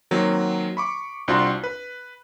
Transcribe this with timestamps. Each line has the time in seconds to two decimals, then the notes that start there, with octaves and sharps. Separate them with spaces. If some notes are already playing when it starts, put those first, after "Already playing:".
0.11 D#3 F#3 A#3 C4
0.77 B5 C#6 D6
1.28 C2 C4 D4 F4 F#4 C6
1.64 B4